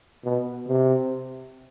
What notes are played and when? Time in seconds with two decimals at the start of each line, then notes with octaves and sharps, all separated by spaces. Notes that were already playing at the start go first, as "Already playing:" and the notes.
0.24 B2
0.68 C3